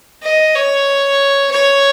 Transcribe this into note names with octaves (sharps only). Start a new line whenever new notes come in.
D#5
C#5
C#5